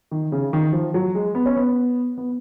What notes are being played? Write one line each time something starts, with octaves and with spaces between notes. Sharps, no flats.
D#3
C#3
D#3
F3
F#3
G#3
B3
C#4
B3
B3